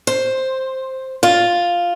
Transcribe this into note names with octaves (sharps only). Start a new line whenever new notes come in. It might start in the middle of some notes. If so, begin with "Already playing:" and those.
C5
F4